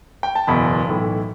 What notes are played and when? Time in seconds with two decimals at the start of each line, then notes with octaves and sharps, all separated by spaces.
0.23 G5
0.35 A5
0.47 F#1 E2 B2 B5
0.87 B1 A2 E3